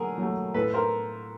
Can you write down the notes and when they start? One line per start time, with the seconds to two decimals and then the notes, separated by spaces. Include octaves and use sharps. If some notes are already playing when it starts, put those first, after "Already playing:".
Already playing: D3 F#3 A3 G#4 A#4
0.18 F#3 A3
0.54 A2 A4 B4
0.74 A#4 C5